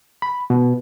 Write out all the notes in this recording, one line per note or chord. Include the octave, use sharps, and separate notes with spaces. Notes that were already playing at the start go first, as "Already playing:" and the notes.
B5
B2